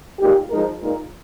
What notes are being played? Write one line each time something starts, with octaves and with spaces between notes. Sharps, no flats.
A#2 G#3 D#4 G4
F3 G#3 D#4 A#4
A#2 G#3 D#4 A#4